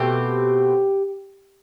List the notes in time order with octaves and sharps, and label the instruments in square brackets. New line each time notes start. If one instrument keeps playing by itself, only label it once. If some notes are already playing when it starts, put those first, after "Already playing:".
Already playing: [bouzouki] B2 A3 C4 G4